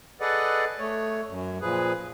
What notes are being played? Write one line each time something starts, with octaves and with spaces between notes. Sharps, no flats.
G#4 A4 B4 D5 D#5 F#5
A3 C#5
F#2
A#2 F3 G#4 B4